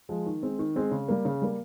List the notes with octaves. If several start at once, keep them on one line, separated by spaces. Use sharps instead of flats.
F3 G#3
D#3
G#3 C4
D#3
G#3 C4
C#3
G3 A#3
C#3
G3 A#3